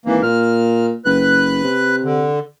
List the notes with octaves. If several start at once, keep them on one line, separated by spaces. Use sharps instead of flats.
G#1 E3 A#3
A#2 F6
F#1 B4 F#6
C3
D3